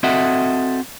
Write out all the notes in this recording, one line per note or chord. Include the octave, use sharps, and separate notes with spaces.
C4 F#4 A4 D#5 E5 F#5